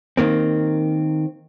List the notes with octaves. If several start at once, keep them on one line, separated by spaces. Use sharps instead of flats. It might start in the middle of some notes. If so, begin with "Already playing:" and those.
D#3 A#3 C4